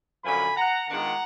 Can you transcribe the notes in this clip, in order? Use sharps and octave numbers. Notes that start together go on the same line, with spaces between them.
F#2 D3 F3 G#5 B5
F#5 A#5
D#3 G#3 B3 D4 F4 F#5 A#5